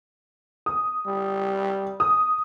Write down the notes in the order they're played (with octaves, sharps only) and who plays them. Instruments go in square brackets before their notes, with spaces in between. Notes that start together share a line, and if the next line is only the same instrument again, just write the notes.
[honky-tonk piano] D#6
[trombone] G3
[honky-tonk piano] D#6